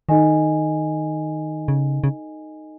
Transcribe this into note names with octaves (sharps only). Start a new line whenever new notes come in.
D#3 D#4 A4 D#5 G#5
C#3
C#3